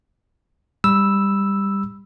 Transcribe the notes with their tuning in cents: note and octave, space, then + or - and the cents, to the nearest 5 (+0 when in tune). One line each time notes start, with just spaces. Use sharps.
G3 +15 B5 -5 E6 +0